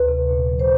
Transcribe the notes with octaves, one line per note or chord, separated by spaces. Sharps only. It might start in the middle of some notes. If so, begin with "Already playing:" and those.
Already playing: D2 B4
C3
A#2
F3
C5